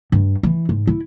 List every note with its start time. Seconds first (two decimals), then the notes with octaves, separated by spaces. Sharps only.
0.12 G2
0.43 E3
0.69 G#2
0.87 E4